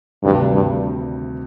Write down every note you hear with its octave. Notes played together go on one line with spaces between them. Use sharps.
D2 G2 C3 D#3 G3
G2